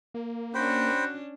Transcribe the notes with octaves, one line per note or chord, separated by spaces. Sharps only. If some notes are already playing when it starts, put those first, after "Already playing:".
A#3
C#4 D4 F#4 C5 G5 B5